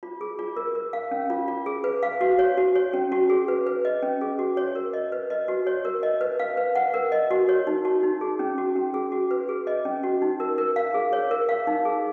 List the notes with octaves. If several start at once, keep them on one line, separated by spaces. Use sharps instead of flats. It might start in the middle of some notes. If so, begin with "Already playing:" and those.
F4
G#4
F4
A#4
A#4
F5
C#4
F4
F4
G#4
B4
F5
F#4
C#5
F#4
C#5
C#4
F#4
G#4
B4
B4
D#5
C#4
G#4
F#4
C#5
A#4
D#5
B4
D#5
F#4
C#5
A#4
D#5
B4
F5
B4
F#5
A#4
D#5
F#4
C#5
D#4
F#4
D#4
G#4
C#4
F#4
C#4
G#4
F#4
B4
G#4
D#5
C#4
F#4
D#4
A#4
A#4
F5
G#4
C#5
A#4
F5
D#4
G#4